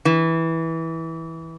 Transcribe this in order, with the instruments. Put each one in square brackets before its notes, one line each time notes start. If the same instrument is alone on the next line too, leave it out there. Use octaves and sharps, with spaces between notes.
[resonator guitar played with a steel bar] E3